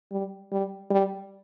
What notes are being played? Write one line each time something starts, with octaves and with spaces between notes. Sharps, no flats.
G3
G3
G3